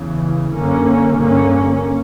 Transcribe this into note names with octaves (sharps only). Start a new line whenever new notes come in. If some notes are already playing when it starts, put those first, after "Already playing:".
Already playing: E2 C#3 E3
F#2 D3 A#3 C#4
G2 D3 A#3 C#4